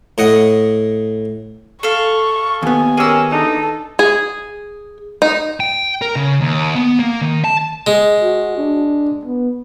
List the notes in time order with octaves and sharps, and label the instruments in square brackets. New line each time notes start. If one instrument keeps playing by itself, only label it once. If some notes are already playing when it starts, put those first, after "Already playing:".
[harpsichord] A2 D#5 F#5 D#6
[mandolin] A4 F5 [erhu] C#6
[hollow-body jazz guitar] D#2 B3 [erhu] G#5
[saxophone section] C#4 G4 A#4 [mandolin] G#4 E6
[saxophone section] E3 D4 D#4 [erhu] A4
[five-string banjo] G#4
D#4
[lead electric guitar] G5
A#4
C#3
D#2
B3
A#3
D#3
A5
[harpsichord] G#3
[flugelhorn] F#4
D4
B3